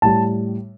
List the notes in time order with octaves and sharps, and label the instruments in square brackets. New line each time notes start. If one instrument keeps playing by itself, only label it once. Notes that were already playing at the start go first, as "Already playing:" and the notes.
[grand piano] A2 G3 A5